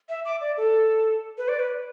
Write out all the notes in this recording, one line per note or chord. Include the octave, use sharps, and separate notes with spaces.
E5
D6
D5
A4
B4
D5
B4